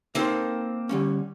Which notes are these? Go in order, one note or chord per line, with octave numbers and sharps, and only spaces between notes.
A#3 C4 D#4 A4 C5
D3 G3 C#4